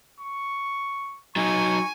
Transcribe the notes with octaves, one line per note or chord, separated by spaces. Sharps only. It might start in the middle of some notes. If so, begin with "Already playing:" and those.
C#6
F#3 D#4 G#5 C#6